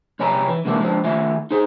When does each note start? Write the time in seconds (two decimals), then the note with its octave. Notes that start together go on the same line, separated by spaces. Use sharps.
0.19 C2 G3 C#5 G#5 A#5 B5
0.48 E3
0.65 C3 E3 G#3 A#3 D4 E4
0.80 F3 G#3 A#3 C4 D4
1.04 D#3 A3 F4 E5 G#5
1.51 D#4 G#4 C5